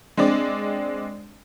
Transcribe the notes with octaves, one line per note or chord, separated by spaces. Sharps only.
G#3 C4 D4 D5